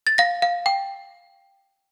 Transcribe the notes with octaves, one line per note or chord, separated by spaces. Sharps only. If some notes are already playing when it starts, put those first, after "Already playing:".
A6
F5 A#6
F5
G5